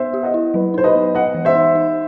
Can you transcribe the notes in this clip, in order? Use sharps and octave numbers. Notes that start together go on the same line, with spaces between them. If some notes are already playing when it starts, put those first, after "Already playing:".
Already playing: B3 C5 E5
G4
D#5 F#5
E4
F#3 B4
D#4 C5
B4 D#5
B3
B3 D#5 F#5
E3
C5 E5
D#4
D#4